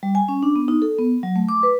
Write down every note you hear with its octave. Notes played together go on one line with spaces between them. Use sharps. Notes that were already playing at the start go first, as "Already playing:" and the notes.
G3
G#5
C#4
D4
B3
D#4
A4
B3
F#3
A3
D6
B4